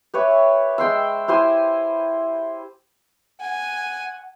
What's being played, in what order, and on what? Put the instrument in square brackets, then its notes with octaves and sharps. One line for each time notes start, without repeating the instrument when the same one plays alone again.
[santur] G4 B4 C#5 E5
G#3 G5 C6 E6
E4 G4 C5 G#5
[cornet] F#5 [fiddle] G#5